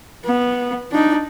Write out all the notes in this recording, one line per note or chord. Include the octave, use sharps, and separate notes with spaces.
B3
D4 D#4